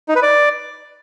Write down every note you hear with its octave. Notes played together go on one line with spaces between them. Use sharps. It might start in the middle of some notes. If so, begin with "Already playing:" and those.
D#4
B4
D5